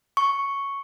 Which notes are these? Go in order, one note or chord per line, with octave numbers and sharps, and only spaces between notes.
C#6